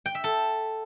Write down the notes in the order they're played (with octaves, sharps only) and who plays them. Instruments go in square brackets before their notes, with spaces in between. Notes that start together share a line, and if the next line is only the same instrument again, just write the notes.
[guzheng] G5
E5
A4